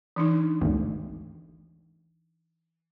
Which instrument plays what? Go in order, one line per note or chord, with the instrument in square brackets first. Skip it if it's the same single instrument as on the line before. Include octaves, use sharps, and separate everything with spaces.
[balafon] E3 D4 D#4
[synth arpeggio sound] G#1 D2